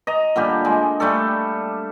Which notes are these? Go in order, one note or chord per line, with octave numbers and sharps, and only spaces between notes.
D#5 A#5
A#2 D3 G3 G4
G#3
G3 A3 D4 A4